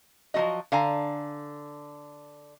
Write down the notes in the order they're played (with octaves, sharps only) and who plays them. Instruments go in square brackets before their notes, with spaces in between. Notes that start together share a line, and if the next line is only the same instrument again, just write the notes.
[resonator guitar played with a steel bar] F3 F#3 A3 F#4 D#5
D3 F5 G#5 A#5